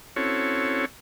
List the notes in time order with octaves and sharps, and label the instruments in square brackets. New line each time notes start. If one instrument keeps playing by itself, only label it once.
[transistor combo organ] C4 C#4 E4 F#4 A4 C#5